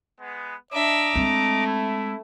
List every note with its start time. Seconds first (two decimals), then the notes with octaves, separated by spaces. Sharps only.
0.20 G#3 B3
0.73 D4 D#5 E5 A#5 D6
1.15 G#3 A3 C4
1.66 E4